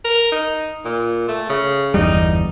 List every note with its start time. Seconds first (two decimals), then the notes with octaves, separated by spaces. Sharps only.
0.05 A#4
0.32 D#4
0.85 A#2
1.28 A3
1.49 C#3
1.94 G1 E2 G3 D#4